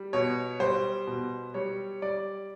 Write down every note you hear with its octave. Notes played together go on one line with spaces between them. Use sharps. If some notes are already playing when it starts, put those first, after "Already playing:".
Already playing: G3
B2 C#5
G3 C5
B2
G3 C#5
G3 D5